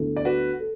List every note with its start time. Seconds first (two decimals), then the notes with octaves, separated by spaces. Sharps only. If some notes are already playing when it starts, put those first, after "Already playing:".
Already playing: D2 D3 B3 E4 A4
0.17 D5
0.25 F#4 B4
0.60 A4